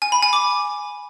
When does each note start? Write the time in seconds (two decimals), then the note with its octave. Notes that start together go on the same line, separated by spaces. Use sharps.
0.02 G#5
0.12 B5
0.23 G#5
0.33 D6